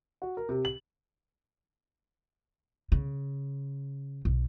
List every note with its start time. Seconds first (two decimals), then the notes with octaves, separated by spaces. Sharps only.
0.22 F#4
0.37 A#4
0.49 C3
0.65 F#7
2.92 C#3
4.25 B1